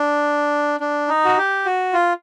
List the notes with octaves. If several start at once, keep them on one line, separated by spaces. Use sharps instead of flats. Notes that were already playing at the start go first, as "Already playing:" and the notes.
Already playing: D4
D4
D#4
F#4
G4
F#4
F4